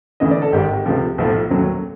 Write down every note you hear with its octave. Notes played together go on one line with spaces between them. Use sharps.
D2 C#3 E3 A3 D#5
D5
A4
G#1 G#2 D#3 G4
C#2 C3 F3 A3 G4
B1 A2 F3 A3 A4
D#2 C#3 F#3 A3